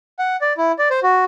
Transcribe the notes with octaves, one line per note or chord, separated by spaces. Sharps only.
F#5
D5
E4
D5
C5
F#4